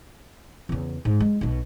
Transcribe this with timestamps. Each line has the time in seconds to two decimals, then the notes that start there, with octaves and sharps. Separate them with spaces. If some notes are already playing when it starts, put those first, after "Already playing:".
0.69 E2 C#3
1.05 G#2
1.20 G#3
1.41 B1 B2